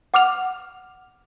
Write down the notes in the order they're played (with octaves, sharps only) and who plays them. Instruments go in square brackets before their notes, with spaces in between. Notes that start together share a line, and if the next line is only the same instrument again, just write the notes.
[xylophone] F#5 D6 F6 F7